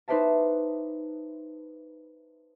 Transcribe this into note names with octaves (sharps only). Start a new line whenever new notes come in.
D#4 B4 C5 D5 E5 A5